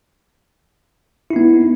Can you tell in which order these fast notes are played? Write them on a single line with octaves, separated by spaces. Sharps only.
E4 D#4 B3